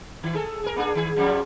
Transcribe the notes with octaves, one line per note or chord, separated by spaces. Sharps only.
D#3
G#4 A4
G#4 A#4
A#3 D4 G#4
D#3 G#4
F2 F3 F#3